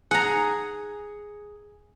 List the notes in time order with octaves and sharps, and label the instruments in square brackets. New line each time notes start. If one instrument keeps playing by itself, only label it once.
[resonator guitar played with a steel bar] G#4 [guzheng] F#5 A#5